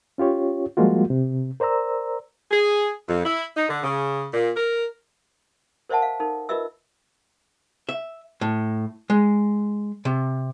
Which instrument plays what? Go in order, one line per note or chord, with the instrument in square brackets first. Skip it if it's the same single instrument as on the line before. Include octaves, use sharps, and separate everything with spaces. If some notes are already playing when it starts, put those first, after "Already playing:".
[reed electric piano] C#4 F4 G4 C#5
F3 G3 G#3 A#3 F4 F#4
C3
A#4 C5 D5 A#5 E6
[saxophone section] G#4
F2
E4
D#4
D3
C#3
A#2
A#4
[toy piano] A#4 C5 D5 E5 F#5 A5
F5
D#4 A4 A#4
F4 A#4 B4 D#5 E5 E6
[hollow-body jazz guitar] E5
A2
G#3
C3